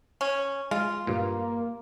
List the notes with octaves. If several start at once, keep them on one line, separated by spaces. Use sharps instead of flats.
C#4
G#3 F4
G2 A#2 A#3